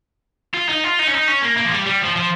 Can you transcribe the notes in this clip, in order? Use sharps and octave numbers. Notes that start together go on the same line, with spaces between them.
F4
D#4
F4
D#4
C#4
D#4
C#4
A#3
A#3
F3
G3
G3
F3
F3